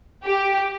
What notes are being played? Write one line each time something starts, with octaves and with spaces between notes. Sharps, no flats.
G4